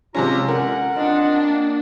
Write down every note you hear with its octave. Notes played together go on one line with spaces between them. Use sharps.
C3 G#3 C#4 F4 A#5
D3 C#4 A#4 F#5
C4 D4 F4 D#5
A#3